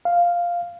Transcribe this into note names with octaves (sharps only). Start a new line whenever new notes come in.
F5